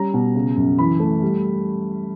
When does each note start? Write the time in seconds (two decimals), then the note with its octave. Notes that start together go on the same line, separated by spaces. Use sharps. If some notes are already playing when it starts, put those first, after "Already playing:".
Already playing: G3 C#4 A#5
0.14 B2
0.35 C#3
0.56 F#2
0.78 E3 B5
1.00 A3
1.22 G3